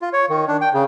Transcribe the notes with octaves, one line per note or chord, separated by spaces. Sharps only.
F4
C#5
D#3
D4
G5
C#3